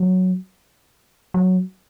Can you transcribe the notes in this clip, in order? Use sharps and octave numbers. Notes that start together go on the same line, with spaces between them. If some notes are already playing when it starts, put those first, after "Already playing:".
Already playing: F#3
F#3